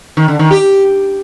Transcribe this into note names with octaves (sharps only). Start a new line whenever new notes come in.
D#3
D3
D#3
G4